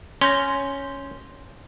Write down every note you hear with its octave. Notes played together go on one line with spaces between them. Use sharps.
C#4 C6 G6 A#6